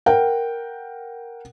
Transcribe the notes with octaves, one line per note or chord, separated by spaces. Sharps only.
A#4 F#5 G5